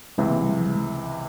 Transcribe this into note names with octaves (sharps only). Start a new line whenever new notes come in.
C#2 C3 E3 G#3
A#3
G3
F3
G3
G#3